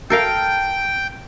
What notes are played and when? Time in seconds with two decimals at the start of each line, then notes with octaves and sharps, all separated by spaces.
0.10 A4 A#4 F5 G5